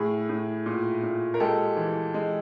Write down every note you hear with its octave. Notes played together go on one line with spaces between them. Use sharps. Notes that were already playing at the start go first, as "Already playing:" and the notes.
Already playing: A2 G#4
A2
A#2
A#2
A#4
G#3 G4 A4
E3
G#3